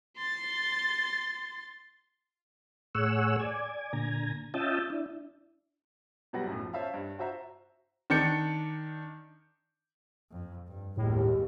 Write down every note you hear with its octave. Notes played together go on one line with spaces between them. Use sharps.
C6 A6
A2 G#4 C#5 F#5 E6
D5 G#5
A#2 D3 G#5 A#5
C#4 F4 D#5 E5 G5 A5
D4 E4
B2 F#3 G3 B4 F#5 A#6
B1 F#2 A2
F3
C#4 C5 E5 F5 A5
G2
F4 F#4 C5 E5 A#5
D#3 D4 G6 C#7
F2
G2
G1 D#2 A2 G#3 G4